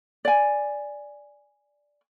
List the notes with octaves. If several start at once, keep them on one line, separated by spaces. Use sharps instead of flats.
D5 G#5